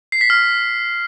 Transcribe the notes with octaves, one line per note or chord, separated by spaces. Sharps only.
C7
B6
F6